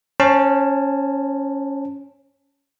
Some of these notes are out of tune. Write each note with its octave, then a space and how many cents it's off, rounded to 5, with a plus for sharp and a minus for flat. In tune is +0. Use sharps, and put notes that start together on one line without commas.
C#4 +0 C5 +40 A5 +10